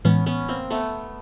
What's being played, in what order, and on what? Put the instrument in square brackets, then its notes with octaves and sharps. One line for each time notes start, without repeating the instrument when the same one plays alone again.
[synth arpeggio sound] A2 E3 G#3 [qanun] B3 C#4
[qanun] B3 C#4
A#3 C4
A3 B3